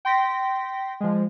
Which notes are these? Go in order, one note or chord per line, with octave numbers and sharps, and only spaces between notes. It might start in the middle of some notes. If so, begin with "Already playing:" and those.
G5 C6 A#6 B6
F3 G#3